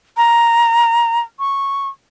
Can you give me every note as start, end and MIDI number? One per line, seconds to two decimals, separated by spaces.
0.17 1.20 82
1.39 1.89 85